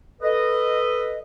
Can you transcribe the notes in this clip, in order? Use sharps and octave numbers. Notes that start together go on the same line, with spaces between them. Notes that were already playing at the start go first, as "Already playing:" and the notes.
A4 B4 D#5